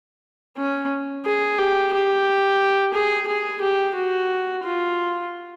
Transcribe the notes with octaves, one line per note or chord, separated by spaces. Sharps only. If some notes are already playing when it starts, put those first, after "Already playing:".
C#4
G#4
G4
G4
G#4
G#4
G4
F#4
F4